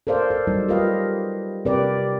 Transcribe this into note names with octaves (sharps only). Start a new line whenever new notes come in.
A4 A#4 C5 D5 F5
A4
F#3 G3 D#4
F4 G4 A#4 B4 D#5 F5
C3 G4 A#4 B4 D5